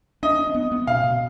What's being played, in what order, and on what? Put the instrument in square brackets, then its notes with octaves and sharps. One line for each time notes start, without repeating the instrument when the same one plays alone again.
[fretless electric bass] D4 [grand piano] D#5
[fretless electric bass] D4
B3
B3
[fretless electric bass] B2 [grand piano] F5
[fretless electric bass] B2